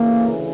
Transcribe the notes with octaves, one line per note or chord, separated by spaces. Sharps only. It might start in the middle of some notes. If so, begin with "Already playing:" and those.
Already playing: D2 C#3 E3 A#3